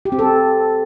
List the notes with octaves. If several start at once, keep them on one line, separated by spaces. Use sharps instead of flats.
G4
C4
A4